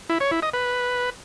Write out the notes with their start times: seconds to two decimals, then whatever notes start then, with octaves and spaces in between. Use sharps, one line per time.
0.09 E4
0.20 C#5
0.31 E4
0.42 D#5
0.53 B4